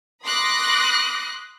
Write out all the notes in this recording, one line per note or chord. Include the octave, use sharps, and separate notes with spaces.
B5 C6 D6 D#6 F#6 A#6